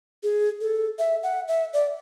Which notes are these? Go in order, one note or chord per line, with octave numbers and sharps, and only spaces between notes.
G#4
A4
E5
F#5
E5
D5